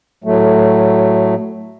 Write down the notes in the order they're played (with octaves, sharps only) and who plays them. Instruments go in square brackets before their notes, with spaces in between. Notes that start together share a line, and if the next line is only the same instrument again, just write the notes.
[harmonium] A2 F#3 A3